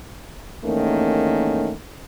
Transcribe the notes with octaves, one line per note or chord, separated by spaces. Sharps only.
E2 D#3 A3 A#3 C#4